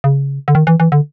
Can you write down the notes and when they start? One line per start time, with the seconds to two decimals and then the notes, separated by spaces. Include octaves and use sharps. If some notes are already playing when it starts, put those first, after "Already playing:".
0.04 C#3
0.48 D3
0.55 D#3
0.67 E3
0.80 E3
0.92 D3